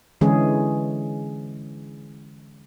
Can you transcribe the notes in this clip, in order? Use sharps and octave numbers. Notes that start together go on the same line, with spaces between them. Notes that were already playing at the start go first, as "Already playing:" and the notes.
D3 E3 G#3 C#4 G#4